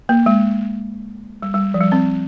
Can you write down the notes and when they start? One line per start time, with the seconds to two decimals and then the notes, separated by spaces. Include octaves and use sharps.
0.09 A#3
0.26 G#3
1.42 G3
1.54 G3
1.74 F3
1.80 G3
1.92 C4